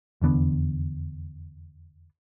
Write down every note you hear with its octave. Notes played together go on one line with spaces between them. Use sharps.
F1 E2 D3 B3